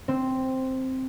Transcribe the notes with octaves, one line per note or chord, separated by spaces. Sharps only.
C4